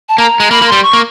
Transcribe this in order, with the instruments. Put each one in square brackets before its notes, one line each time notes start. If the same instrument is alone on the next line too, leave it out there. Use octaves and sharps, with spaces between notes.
[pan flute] A5
[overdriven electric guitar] A#3 [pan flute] A#5
[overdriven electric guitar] G#3
[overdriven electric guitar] A#3 [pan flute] B5
[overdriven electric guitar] A#3
[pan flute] C6
[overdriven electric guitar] G3
[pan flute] C#6
[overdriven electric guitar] A#3